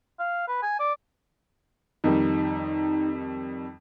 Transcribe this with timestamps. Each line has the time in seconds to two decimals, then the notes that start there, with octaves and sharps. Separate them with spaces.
0.19 F5
0.48 B4
0.62 G#5
0.79 D5
2.04 F2 D#3 G3 D#4